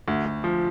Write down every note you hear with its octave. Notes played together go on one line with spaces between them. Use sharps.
D2
D2
F3